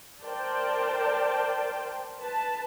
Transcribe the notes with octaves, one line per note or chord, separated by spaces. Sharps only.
A#4 C5 D5 G5 A5
B4 A5